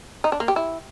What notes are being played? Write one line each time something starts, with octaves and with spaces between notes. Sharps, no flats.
D#4
D4
A#3
G4
E4